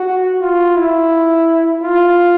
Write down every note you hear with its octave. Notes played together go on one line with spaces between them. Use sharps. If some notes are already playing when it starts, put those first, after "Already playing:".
Already playing: F#4
F4
E4
F4